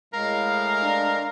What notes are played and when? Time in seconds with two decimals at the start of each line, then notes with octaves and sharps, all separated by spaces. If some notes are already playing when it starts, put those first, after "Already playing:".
0.14 A2 G#3 A#4 F5
0.83 D4